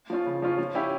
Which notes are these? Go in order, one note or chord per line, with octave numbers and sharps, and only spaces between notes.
F3 C#4 F4
C#3
F3 C#4 F4
F3
C#4 E4 G4